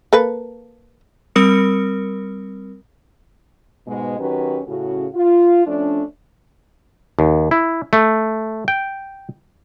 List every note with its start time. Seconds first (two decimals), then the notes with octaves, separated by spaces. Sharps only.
0.13 A#3 A4 B4
1.35 G3 C4 A#4 D#6 C#7
3.87 G#2 B2 G#3
4.19 D#3 F#3 C#4 G4 B4
4.67 A2 C#3 F#4
5.15 F4
5.66 F3 A3 C#4 D4
7.19 D#2
7.51 E4
7.93 A3
8.68 G5